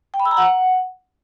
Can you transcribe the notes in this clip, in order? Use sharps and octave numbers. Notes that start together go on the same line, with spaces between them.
G5
B5
E6
A#5
F#5